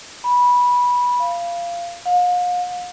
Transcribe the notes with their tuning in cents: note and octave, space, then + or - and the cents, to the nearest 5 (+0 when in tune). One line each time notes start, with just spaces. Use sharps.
B5 -15
F5 -20
F5 +40